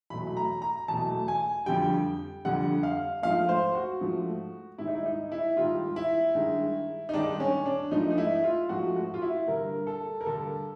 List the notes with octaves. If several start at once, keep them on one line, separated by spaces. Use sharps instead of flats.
E2 B2 F#3 A3 B5
B5
A#5
A#5
E2 B2 F#3 A3 A5
G#5
F2 D3 G3 G5
F2 D3 G3 F#5
F5
G#2 F3 A3 F5
C5
F#4
G#2 F3 A3
G#2 D#3 G3 E4
D#4
E4
D#4
E4
G#2 D#3 G3 F4
E4
G2 D#3 G#3
D#4
G2 D#3 G#3 D4
C#4
D4
G#2 F3 A3 D#4
D#4
E4
F4
G#2 F3 A3 F#4
F#4
F4
E4
G2 D3 G3 A#4
A4
A#4
G2 D3 G3 A4